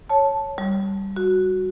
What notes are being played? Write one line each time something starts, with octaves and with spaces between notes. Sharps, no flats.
C#5 A5
G3
F#4